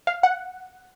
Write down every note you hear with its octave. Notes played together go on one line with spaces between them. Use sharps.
F5
F#5